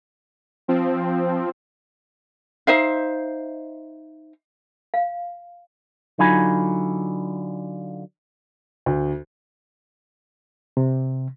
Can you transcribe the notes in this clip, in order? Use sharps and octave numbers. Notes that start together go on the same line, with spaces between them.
F3 C4
D#4 C5 E5 F5
F5
D3 F#3 D#4 F4 G#5 B5
D2
C3